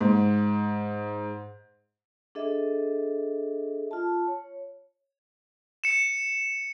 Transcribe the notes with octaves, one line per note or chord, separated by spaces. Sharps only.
G#2
D4 G#4 A4 D#5 E5
F4 A5
C#5
C#7 E7